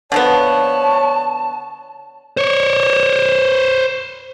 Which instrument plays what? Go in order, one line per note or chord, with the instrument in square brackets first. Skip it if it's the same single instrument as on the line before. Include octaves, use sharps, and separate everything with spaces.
[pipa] D3 F3 B3 [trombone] C#5 [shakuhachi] A5
[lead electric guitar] C5 C#5